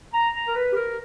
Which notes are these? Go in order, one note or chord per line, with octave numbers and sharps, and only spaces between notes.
A#5
A#5
A#4
B4
G4
A#4